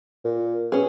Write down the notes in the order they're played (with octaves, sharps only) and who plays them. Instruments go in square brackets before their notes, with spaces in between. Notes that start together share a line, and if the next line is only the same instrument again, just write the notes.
[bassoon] A#2
[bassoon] B2 [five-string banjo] C#4 G#4